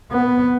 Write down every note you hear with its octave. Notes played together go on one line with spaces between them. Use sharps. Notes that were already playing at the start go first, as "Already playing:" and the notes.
B3